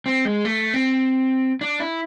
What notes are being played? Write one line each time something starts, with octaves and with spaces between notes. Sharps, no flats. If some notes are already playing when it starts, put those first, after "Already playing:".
C4
G#3
A3
C4
D4
E4